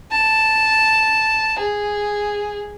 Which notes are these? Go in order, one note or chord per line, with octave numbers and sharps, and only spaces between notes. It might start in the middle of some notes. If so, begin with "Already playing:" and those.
A5
G#4